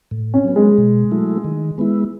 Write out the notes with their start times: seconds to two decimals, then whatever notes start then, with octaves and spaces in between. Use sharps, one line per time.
0.11 A2
0.34 C#4
0.45 F#3 B3
0.56 G#3
0.78 B2
1.11 F#3 A3 E4
1.44 D#3
1.78 G#3 B3 E4